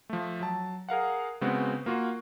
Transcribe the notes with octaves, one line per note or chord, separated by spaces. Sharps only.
F3 A3
F#3 A5
G#4 A#4 F5 F#5
C#3 G#3 B3 C4 F#4
A#3 F4 F#4